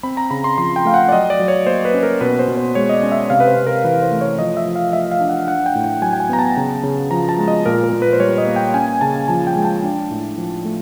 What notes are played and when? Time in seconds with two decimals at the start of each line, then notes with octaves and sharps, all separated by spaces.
0.03 C4 B5
0.17 A#5
0.30 C#3 B5
0.44 C6
0.58 F3 C6
0.76 G5
0.85 A3 F5
0.94 F#5
1.09 D5
1.12 F#3 D#5
1.30 D5
1.39 F#3
1.48 C#5
1.67 A#3 C5
1.85 B4
1.94 C#4
2.03 A#4
2.21 B2 B4
2.39 C5
2.48 B2
2.57 C5
2.75 G#3 C#5
2.89 D#5
2.94 D5
3.03 C#4
3.12 E5
3.30 C3 F5
3.40 B4
3.48 C5
3.57 C3
3.67 A#4
3.84 E3 B4
4.02 C5
4.12 A3
4.21 C#5
4.39 F3 D#5
4.57 E5
4.66 F3
4.76 F5
4.93 A3 E5
5.12 F5
5.20 D4
5.29 F#5
5.47 D4 F#5
5.66 G5
5.75 A2
5.84 G5
6.02 F#3 G#5
6.13 G5
6.20 G#5
6.29 B3 A#5
6.39 A5
6.57 C#3
6.83 C#3
7.11 F3 A#5
7.29 A5
7.38 G#3
7.48 D#5
7.66 A#2 A#4
7.84 A#4
7.93 A#2
8.02 B4
8.13 C5
8.20 G3 C#5
8.38 D#5
8.47 A#3
8.56 G5
8.74 C#4 G#5
9.01 C#3 A5
9.28 F3 A5
9.47 G5
9.56 G#3
9.65 A5
9.84 D4
10.11 A2
10.38 F3
10.65 A3